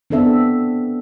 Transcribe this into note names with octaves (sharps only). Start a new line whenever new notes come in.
B3 C4 D4 A4 E5